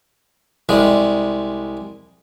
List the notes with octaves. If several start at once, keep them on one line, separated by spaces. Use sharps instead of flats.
C2 G3 G#3